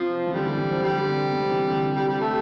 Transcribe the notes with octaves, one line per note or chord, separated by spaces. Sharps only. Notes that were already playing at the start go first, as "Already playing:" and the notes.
Already playing: C3 F3
E3
D3 G3
E3
E3
F3
D3 G3
D3
C3
C3
E3
D3
G3
G3
A3